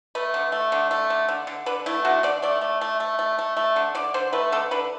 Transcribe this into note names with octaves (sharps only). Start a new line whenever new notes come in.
A3 B4
D3
A3
D3
A3
D3
D3
D3
D3 B4
A3 E4
D3 F#4
D3 D5
A3 D5
A3
A3
A3
A3
A3
A3
D3
D3 D5
D3 C5
A3 B4
D3 A4
D3 B4